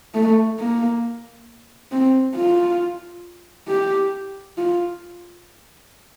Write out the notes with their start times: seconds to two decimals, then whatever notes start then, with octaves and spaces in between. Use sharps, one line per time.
0.14 A3
0.59 A#3
1.91 C4
2.35 F4
3.68 G4
4.58 F4